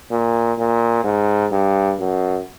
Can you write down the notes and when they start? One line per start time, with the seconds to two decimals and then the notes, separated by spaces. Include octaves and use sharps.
0.11 A#2
0.58 A#2
1.04 G#2
1.51 G2
1.98 F#2